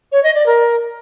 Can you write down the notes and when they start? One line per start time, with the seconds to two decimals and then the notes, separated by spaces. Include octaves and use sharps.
0.12 C#5
0.23 D#5
0.35 D5
0.46 A#4